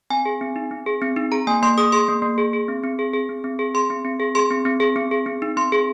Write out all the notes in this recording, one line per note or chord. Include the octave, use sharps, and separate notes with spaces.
C4 G#5
G#4
C4
D#4
C4
G#4
C4
D#4
G#4 A#5
A#3 G#5
A#3 C6
G#4 D#6
G#4 C6
A#3
A#3
G#4
G#4
C4
C4
G#4
G#4
C4
C4
G#4
G#4 C6
C4
C4
G#4
G#4 C6
C4
C4
G#4
C4
G#4
C4
D#4
C4 C6
G#4